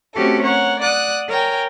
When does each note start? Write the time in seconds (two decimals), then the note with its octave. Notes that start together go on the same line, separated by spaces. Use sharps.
0.14 A3 C4 C#4 F#4 G4 A4
0.43 A#4 C#5 F#5
0.80 D5 F#5 D#6 F#6
1.28 A#4 C#5 G5 G#5